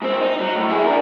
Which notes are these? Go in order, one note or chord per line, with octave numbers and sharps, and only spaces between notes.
G#2 C4
D#4
F#3
A2
E4 G#4
D4 A#4